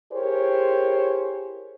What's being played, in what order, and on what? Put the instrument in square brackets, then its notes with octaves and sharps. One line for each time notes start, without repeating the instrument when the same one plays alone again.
[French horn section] E4 G4 G#4 A#4 C5 C#5